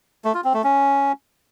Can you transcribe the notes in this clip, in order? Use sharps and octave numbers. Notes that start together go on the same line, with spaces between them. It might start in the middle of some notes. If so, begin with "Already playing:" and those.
A3
F4
C4
A3
C#4